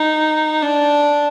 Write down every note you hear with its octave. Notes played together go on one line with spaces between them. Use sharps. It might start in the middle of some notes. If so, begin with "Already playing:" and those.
Already playing: D#4
D4